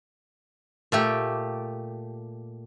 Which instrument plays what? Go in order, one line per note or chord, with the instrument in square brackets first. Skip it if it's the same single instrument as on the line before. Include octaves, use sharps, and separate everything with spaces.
[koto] A#2 A3 G4